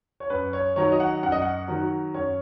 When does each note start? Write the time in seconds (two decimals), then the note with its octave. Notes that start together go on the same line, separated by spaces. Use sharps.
0.20 C#5
0.30 F#2 B4
0.53 C#5
0.76 D#3 F#3 C#5
0.92 D#5
1.00 F#5
1.23 F#2 F#5
1.32 D#5
1.42 F#5
1.68 D#3 F#3
2.14 F#2 C#5